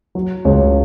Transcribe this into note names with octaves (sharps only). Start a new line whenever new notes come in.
F#3
C#2 C#5